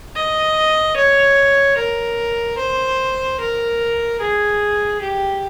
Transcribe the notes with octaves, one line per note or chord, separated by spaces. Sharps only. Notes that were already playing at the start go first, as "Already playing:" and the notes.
D#5
C#5
A#4
C5
A#4
G#4
G4